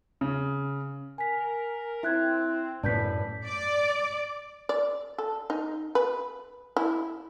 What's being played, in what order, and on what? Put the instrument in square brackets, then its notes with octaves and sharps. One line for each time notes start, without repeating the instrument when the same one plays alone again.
[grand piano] C#3
[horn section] A#4 [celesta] G#5 B6
[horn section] C4 [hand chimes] E4 [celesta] E5 F#6 G#6
[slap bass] F#2 A2 [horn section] B4 [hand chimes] D5 [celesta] A5 G6 B6
[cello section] D5
[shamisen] D5
A4
D#4
B4
E4